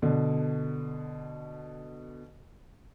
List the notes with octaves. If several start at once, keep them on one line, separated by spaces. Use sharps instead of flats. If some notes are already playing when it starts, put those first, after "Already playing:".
B2 D3